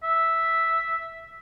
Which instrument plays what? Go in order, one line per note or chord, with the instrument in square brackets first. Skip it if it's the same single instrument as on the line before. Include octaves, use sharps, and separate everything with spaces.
[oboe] E5